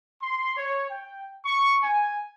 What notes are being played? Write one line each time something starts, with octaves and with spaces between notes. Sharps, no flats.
C6
C#5
G5
C#6
G#5